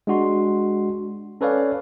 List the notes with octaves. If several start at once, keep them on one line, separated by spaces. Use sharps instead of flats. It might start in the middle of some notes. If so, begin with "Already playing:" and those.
G#3 D4 F#4 C6
C#4 A4 B4 C#5 D5 F5